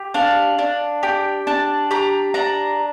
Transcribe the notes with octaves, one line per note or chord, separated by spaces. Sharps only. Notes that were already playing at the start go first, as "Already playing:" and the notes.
Already playing: G4
D4 F5
D4
G4 G5
D4 A5
G4 A#5
D4 A#5